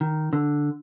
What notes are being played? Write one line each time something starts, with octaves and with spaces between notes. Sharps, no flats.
D#3
D3